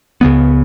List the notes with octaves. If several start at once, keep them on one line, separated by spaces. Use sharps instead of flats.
C#2 C#3 G#3 B3